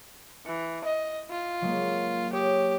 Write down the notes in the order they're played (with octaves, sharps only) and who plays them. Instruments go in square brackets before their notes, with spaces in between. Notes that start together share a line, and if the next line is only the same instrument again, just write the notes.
[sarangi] E3 [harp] C#7
[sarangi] D#5
F4
[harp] F#3 G#3 A#3
[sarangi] G4 [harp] C#5 D#6